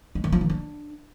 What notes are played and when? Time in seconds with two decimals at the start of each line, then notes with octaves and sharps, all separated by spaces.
0.15 G#3
0.24 D#3
0.32 F3
0.41 D#3
0.50 D4